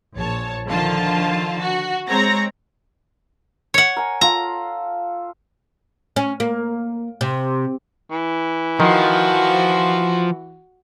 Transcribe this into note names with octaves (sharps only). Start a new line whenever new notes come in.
A#1 C#5 A5
D3 D#3 F3 F4 A5
F#4
G#3 C4 C#5 A#5 A#6
C#5 F#5
A#4 G#5
F4 A4 A#5
C#4
A#3
C3
E3
D#3 F3 F#4